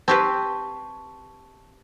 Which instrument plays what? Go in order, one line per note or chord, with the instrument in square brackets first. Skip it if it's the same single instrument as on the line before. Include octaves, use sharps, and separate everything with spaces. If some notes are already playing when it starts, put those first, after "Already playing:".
[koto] C4 G4 B4 [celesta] A5 C#6 G#6